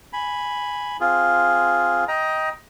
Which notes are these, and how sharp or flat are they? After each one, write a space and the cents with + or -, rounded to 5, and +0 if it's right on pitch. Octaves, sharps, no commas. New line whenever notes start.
G#5 +0 B5 +0
C4 -5 F4 +0 G#4 +0
D#5 +15 G5 +0 A#5 +20